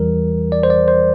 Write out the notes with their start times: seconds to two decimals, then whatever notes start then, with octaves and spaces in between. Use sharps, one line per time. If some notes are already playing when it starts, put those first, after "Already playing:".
Already playing: E2 E3 G3 A#4
0.52 D5
0.63 C5
0.70 D5
0.88 C5